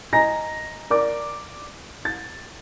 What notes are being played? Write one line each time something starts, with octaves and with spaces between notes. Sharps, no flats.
D#5 G#5 A#5 A#6
A#4 D5 D6
A6